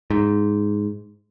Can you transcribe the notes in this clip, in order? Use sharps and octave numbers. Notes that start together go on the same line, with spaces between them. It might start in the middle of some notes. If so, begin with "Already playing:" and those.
G#2